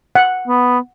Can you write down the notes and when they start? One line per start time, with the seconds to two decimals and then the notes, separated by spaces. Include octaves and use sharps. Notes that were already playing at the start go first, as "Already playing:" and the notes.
0.15 F#5
0.48 B3